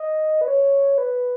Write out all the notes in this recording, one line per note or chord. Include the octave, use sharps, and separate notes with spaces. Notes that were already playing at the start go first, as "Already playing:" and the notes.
Already playing: D#5
B4
C#5
B4